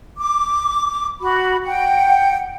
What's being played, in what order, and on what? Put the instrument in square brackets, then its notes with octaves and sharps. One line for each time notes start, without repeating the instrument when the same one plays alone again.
[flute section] D6
F#4 B5
F#5 G5